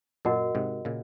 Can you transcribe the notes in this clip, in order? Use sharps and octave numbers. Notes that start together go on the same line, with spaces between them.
F#2 A#2 F#4 A#4 D#5 F#5
G#2 C3
A#2 C#3